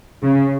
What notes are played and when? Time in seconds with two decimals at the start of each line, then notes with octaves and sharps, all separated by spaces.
0.24 C#3